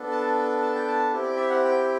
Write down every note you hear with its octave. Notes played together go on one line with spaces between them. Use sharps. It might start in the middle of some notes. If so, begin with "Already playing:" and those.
Already playing: B3 D4 A4
A5
A5
G5
A5
C4 E4 G4
D5
E5
F#5
G5